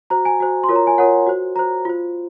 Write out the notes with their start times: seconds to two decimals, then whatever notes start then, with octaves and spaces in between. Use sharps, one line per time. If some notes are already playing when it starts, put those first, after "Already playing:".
0.10 F#4 C5 A#5
0.25 G#5
0.40 F#4 C5
0.64 C6
0.69 F4 A#4 C#5
0.76 A#5
0.87 G#5
0.98 F4 A#4 C#5 F#5
1.27 F#4 C5
1.55 F#4 C5 A#5
1.85 F4 C5